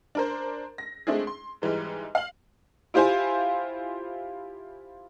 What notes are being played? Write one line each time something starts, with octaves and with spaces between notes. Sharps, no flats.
D4 A#4 C5
A#6
G#3 A3 C4 D4 E4 G#4
C6
G#2 E3 G3 G#3
F5 F#7
E4 F4 G4 C5 F5 G#5